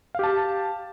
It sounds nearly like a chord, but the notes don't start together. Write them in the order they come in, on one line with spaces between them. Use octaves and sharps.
F5 G4 A5